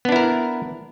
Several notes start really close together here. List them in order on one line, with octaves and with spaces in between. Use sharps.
B3 D4 E4 A#4